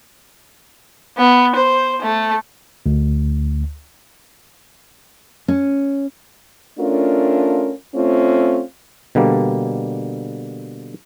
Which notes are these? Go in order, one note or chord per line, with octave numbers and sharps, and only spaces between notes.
B3
C5
A3
D2
C#4
A3 C#4 D4 F4 A#4
A3 C4 C#4 F4
B2 D3 G3 A#3